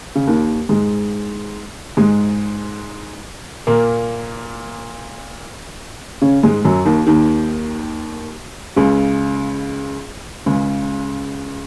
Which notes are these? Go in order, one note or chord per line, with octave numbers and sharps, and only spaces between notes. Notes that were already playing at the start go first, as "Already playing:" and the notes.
C#3
D#2 D#3
G#2 G#3
G#2 G#3
A#2 A#3
C#3 C#4
G#2 G#3
F#2 F#3
D#2 D#3
D#2 D#3
C#2 C#3
C#2 C#3